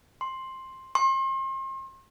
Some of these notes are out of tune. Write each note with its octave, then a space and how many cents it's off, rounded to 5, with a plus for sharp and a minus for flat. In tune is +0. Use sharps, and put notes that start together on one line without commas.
C6 +10
C6 +40